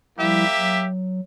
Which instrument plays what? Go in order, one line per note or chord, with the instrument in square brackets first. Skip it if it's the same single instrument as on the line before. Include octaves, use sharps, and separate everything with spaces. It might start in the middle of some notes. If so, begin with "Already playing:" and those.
[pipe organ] F3 G3 E4 [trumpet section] A#3 G4 E5
[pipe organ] F#3